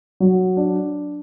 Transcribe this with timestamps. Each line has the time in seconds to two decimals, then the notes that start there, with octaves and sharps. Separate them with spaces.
0.20 F#3
0.57 D4